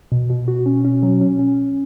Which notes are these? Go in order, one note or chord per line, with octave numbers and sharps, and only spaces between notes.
B2
B2
F#4
C#4
C#4
F#3
C#4
C#4